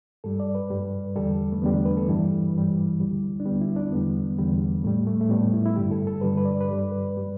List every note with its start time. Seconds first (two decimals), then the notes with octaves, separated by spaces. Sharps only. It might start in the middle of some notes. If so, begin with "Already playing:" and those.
0.24 G2 G3 A4
0.40 D5
0.55 B4
0.71 G2 G3
1.16 E2 D3 G3 A4
1.53 A3
1.61 E2 D3 G3 B3
1.73 D4
1.85 B4
1.97 A4
2.08 G2 E3 G3 E4
2.54 G2 E3 G3
3.00 D2 D3 G3
3.40 D4
3.46 D2 D3 G3 B3
3.61 E4
3.76 D4
3.91 E2 D3 G3 B3
4.38 E2 D3 G3
4.84 A2 G3 A3
5.07 A3
5.21 A3
5.29 A2 G3 B3
5.53 E4
5.66 E4
5.76 G2 D3 G3 G4
5.91 A4
6.07 A4
6.21 G2 D3 G3 B4
6.37 B4
6.45 D5
6.61 B4
6.68 G2 G3 D5
6.92 B4
7.17 G3